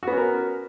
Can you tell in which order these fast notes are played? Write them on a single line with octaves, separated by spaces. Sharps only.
F#4 B3 C#4 A#4